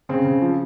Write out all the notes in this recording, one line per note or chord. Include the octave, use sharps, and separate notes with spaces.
C#3 C4
C#3
F3